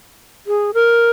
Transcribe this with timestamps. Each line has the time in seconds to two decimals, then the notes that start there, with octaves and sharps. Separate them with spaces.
0.47 G#4
0.74 A#4